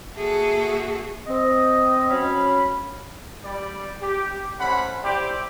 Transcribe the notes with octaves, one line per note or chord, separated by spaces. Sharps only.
A#3 F#4 G#4 A4 E5
C4 D#5
F#3 C#4 C#5 F5 B5
G3 D5
G4
G3 A3 C#4 C5 F#5 B5
E4 G4 C5 D5 G5